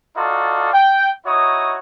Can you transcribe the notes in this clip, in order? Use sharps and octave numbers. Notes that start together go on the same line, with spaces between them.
D#4 F4 F#4 A4 D5
G5
D#4 E4 F#4 C#5 D#6